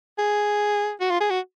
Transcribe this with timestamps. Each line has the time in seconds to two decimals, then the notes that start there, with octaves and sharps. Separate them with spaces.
0.19 G#4
1.00 F#4
1.10 F4
1.20 G#4
1.30 F#4